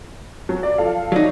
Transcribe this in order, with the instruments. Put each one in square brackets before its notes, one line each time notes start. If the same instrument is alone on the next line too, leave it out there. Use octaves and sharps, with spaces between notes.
[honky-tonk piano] F#3
D5
F3 A4 F5
[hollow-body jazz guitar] F#3 D#4 [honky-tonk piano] F#4 D5